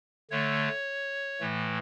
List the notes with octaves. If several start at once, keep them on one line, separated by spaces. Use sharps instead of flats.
D3 A3 C#5
A2 E3 A3